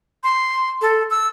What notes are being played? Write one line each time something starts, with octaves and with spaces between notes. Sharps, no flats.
C6
A4
E6